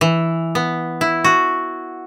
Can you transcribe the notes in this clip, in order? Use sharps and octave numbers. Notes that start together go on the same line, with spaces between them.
E3
B3
E4
F#4